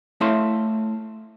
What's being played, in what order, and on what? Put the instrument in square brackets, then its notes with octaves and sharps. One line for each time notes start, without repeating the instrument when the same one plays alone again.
[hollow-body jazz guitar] A3 E4 C#5 E5 F5 C6